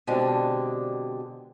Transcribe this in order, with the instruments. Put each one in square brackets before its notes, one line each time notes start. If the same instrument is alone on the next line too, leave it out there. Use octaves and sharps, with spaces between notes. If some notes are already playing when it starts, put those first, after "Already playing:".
[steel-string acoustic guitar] B2 D3 G#3 C4 D4 G4